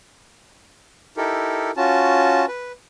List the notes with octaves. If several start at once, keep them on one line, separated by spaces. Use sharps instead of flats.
D#4 E4 G4 A4 A#4
C#4 F4 F#4 A5
B4